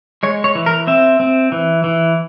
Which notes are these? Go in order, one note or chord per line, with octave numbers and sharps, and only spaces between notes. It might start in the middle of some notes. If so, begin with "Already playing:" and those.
G#3 C#5
C#5
E3
A#4
C4 E5
C4
E3
E3